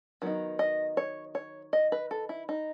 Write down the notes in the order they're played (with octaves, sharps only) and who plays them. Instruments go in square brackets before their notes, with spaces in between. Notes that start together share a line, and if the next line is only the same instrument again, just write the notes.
[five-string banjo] D#3 F#3 B3 D#4
D#5
C#5
C#5
D#5
B4
A4
E4
D#4